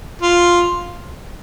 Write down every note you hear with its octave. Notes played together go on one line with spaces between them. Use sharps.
F4